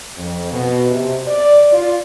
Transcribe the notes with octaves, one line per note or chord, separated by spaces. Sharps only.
F2
B2
C3
D5
F4